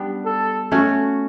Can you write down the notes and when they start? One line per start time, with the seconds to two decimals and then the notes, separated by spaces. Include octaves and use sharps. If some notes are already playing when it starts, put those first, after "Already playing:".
Already playing: G3 B3 D4
0.25 A4
0.72 A3 C#4 F#4